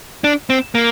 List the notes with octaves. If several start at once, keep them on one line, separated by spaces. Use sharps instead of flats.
D4
C4
A#3